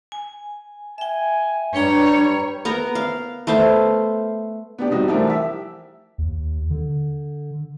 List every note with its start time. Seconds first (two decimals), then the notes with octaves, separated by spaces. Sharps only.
0.12 G#5
0.98 E5 G5 G#5
1.75 G3 D4 B4 C#5 G5 A#5
2.65 B3 A#4 A#5
2.95 F5
3.47 A3 B3 C5 F5
4.78 B3 D4 G4
4.90 C3 G3 D#4 F#4
5.08 E3 F3 G3 A3 G4 A#4
5.27 G4 E5
6.18 D#2
6.70 D3